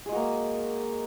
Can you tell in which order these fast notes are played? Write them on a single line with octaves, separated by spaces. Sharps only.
G#4 G#3 F#4 A#3